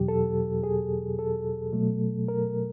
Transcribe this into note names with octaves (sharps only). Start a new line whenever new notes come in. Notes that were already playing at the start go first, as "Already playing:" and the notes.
Already playing: E2 B2 F#3 G4
A4
G#4
A4
B2 F#3 A3
A#4